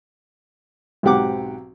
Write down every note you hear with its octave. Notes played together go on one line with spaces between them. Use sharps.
B1 G#2 C4 G4 F#5 D6